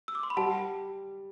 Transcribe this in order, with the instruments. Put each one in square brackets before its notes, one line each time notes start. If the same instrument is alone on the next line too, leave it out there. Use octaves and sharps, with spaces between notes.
[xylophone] E6
D6
C6
B5
[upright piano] G3 [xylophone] F#5 A5